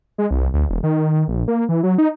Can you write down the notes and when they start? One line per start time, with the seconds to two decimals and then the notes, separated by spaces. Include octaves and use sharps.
0.18 G#3
0.31 C2
0.54 D2
0.70 E1
0.83 D#3
1.28 A#1
1.48 A#3
1.69 E3
1.83 F#3
1.98 D#4